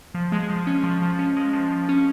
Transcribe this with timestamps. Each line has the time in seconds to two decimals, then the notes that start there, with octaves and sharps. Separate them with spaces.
0.15 F3
0.32 G#3
0.50 F3
0.67 C#4
0.83 F3
1.02 F3
1.19 C#4
1.37 G#3
1.53 F3
1.70 F3
1.89 C#4